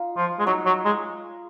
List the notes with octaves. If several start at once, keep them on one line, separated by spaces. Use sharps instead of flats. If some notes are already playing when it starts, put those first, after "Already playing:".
Already playing: D#4 F4
F3
G#3
F#3 D#4
F#3
G#3